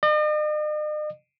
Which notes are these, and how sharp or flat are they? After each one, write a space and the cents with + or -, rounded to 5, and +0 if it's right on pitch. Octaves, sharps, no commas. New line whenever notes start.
D#5 -45